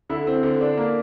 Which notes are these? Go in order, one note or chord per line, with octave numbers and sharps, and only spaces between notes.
D3 E4
C4
D3
D4
A#3